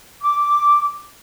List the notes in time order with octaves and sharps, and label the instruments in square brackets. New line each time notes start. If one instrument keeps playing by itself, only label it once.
[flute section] D6